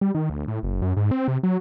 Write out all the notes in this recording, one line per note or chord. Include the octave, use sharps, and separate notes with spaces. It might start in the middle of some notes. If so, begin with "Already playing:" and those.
G3
D#3
D2
A2
F#1
F#2
G#2
C4
C3
F#3